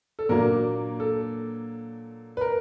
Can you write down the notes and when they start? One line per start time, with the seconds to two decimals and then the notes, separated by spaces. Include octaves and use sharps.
0.19 A4
0.29 A#2 F#3 A#3 D4 A#4
1.00 A4
2.37 B4
2.41 A#4